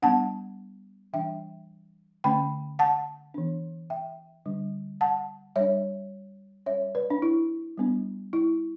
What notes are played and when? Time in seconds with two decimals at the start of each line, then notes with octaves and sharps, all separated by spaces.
0.02 G3 B3 D4 F#5 A5
1.13 E3 G3 D4 E5 G5
2.24 D3 A3 C#4 G5 B5
2.79 F#5 A5
3.34 E3 B3 D4
3.90 E5 G5
4.46 D3 G3 D4
5.01 F#5 A5
5.56 G3 D4 C#5 E5
6.66 G3 C#4 C#5 E5
6.95 B4 D5
7.10 D4
7.22 E4
7.78 G3 B3 D4
8.33 E4